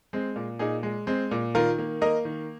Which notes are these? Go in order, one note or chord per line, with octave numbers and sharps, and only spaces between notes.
G#3 C4
A#2
A#2 D#4 G#4
G#3
G#3 C4
A#2
D#3 F4 A#4
A#3
A#3 A#4 D#5
D#3